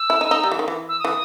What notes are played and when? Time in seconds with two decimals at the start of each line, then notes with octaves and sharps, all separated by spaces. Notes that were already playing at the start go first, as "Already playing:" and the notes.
Already playing: E6
0.10 E4
0.21 D#4
0.31 D#4
0.43 G3
0.51 E3
0.59 D#3
0.68 E3
0.88 E6
0.99 D#6
1.05 E3